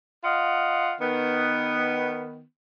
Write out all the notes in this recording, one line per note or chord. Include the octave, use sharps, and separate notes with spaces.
F4 D#5 F5 F#5
D#3 B3